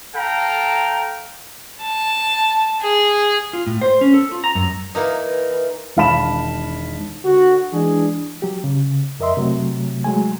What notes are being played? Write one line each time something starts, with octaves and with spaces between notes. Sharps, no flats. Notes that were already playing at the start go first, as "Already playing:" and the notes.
A4 F5 G5 A#5
A5
G#4
F4
A2
C5
C#4
A4
F4
A#5
F#2
E3 A#3 D#4
E1 D#3 F5 A5 B5 E7
D3 F#4
E3 G#3 D4 G#4
F#3 G4
C#3
F2 A#4 D#5 E5 C6
C3 F#3 A3
F#3 G#3 A3 G#5